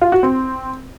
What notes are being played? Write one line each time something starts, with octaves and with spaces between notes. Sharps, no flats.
F4
F#4
C4